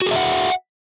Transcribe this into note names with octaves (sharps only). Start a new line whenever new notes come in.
F#4 G#4 E5 F#5